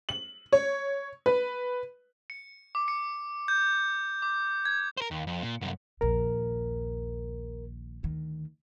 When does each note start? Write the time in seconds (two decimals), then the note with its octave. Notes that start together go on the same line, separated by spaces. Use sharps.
0.09 F#7
0.53 C#5
1.26 B4
2.30 C#7
2.75 D6
2.88 C#7
3.48 G6
4.22 D6
4.65 G#6
4.97 A#4 C5
5.11 D#2
5.27 F2
5.43 A#2
5.61 C2 F#2
6.01 A#1 D#2 A#4
8.03 D2 D#3